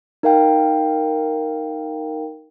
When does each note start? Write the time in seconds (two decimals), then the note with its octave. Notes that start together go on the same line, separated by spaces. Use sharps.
0.23 D#4 A#4 F5 G5